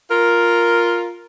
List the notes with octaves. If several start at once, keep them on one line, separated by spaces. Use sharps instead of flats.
F4 A#4